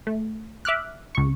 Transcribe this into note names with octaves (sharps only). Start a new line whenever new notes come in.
A3
E5 D6 F6 F#6
C#2 C#6